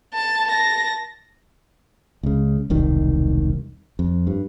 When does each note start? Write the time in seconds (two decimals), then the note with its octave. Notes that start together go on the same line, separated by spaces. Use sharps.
0.13 A5
0.48 A5 A#6
2.23 C#2 C#3
2.70 E1 C2 D#3
3.99 F2
4.27 G2